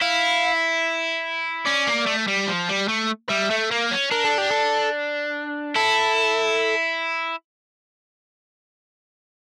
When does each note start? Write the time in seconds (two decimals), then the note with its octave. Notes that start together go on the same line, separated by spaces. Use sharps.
0.01 E4 F5
1.66 C#4 D5
1.87 A#3
2.06 A3
2.27 G3
2.47 F3
2.69 G3
2.88 A3
3.29 G3 E5
3.51 A3
3.71 A#3
3.91 C#4
4.11 D4 A#4
4.25 A4
4.38 G4
4.51 A4
5.76 E4 A4